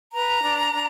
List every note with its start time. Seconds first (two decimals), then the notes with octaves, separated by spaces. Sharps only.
0.13 B4 A#5
0.43 D4
0.74 D4